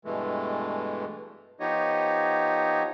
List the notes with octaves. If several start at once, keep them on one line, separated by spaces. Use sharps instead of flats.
G2 B2 E3 G#3 A3
F3 B3 D#4 G4 C#5 D#5